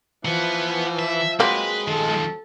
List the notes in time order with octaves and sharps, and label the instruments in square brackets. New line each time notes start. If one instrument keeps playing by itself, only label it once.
[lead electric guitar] E3 [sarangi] F3 [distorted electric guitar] B4 F#5
[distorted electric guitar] E5
[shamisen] F#3 A#3 C4 [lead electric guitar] G#3 [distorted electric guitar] B4
[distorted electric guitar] D#3 F3 [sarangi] A4